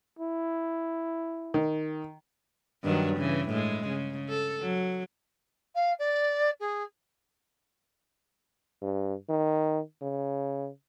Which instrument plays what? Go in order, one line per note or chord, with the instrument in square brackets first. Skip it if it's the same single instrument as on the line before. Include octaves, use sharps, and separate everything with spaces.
[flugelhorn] E4
[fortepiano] D#3
[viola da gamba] G2 D#3 F#3
C#3 E3
A2 G#3
C#3
A4
F#3
[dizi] F5
D5
G#4
[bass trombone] G2
D#3
C#3